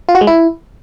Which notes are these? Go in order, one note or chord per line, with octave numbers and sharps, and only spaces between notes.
F4
F#4
G#3
E4